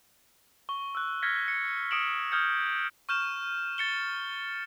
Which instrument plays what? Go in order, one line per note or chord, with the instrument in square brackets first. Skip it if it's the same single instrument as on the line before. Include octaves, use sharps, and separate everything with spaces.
[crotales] C#6 G7
E6 F#6
F6 G#6 A#6 B6 C#7
C#7
D#6 C#7 D7 E7 F#7
D#6 F6 G6 G#6 C#7
C#6 F6 G6 E7
A6 C#7 G7